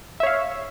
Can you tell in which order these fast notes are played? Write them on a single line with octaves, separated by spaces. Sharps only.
E5 C#5 F5